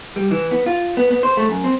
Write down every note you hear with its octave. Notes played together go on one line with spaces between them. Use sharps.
G3
E3
B3
F4
B3
B3
C5
A3
F#2
C4